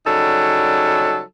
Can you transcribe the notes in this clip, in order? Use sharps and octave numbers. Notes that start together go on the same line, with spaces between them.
C#3 F#3 G3 D#4 A4